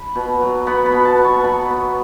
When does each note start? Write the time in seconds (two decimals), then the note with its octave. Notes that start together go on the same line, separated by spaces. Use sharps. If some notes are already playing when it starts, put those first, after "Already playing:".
Already playing: B5
0.15 B2
0.41 F#3
0.67 B3 B5
0.86 B5
0.92 B2
1.05 A5
1.18 B2
1.25 C#6
1.44 F#3 B5
1.70 B3